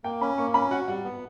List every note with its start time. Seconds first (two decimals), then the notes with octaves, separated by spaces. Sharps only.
0.04 A#3 G5
0.21 C#4 B5
0.38 A#3 C#6
0.54 C#4 B5
0.71 F#4 F#5
0.88 G3 F#5
1.05 B3